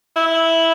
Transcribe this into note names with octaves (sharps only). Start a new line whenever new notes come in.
E4